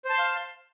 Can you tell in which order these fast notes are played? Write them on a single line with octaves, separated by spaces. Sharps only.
C5 A5 C6 F5